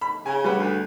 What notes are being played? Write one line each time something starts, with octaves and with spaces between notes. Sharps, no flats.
B5
C#3 G#5
G3 B4 F#5
D2